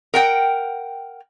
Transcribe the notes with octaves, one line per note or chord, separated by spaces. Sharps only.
A#4 F#5 G5